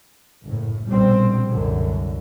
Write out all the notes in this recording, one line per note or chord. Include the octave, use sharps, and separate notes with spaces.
F#1 A2
A#1 B2 G3 C4
C2 F#2 D3